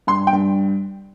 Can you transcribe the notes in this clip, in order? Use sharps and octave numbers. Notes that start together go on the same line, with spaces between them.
G2 C6
G5
G2